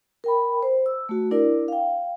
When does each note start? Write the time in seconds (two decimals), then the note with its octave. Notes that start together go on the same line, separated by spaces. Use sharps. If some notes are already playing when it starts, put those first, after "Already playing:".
0.24 A#4 G5 B5
0.63 C5
0.86 E6
1.09 A3 F#4
1.31 D4 E4 A#4 D5
1.68 F5 G5